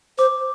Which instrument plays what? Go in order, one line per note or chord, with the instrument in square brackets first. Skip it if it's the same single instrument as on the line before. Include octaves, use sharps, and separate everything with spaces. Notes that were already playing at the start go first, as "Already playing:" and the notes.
[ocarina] C5 [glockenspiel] D6